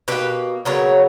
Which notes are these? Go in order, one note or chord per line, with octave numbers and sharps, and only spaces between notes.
B2 A#3 G4 B4
C#3 F#3 B3 A#4 C#5